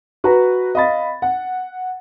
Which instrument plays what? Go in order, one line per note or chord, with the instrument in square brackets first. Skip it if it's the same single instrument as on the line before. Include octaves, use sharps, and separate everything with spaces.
[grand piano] F#4 B4 A#5
D#5 F5 B5 A6
F#5